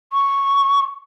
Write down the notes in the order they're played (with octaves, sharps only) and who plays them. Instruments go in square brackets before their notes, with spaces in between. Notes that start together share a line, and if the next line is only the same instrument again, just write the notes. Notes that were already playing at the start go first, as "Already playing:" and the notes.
[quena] C#6